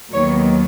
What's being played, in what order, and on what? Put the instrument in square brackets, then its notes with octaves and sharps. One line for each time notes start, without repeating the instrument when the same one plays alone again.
[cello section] D#2 D#3 F#3 B3 C#5